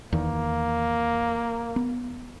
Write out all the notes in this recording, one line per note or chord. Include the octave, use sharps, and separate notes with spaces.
E2 D#3 A#3
B3